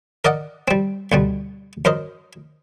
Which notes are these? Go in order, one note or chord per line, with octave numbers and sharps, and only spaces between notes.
A#4 D5 D#5 F#5
G3 C4
D2 B2 G3
F#2 A#4 C5 D#5